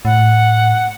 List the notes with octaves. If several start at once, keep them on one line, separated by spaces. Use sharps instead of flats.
A2 F#5